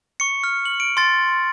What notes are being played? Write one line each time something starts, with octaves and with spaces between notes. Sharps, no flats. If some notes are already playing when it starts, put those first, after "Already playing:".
C#6 C#7
F6
F#7
D7
C6 A6